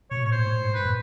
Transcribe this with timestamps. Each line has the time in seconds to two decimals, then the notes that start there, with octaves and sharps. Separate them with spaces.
0.10 B2 C#5
0.22 A2 C#5
0.32 A#2 C5
0.39 G#2
0.45 A2
0.60 G#2
0.74 G2 B4
0.85 A2